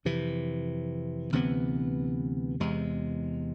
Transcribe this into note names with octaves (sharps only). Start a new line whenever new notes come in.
F2 C3 E3
D2 C3 E3 B3
E2 C3 G#3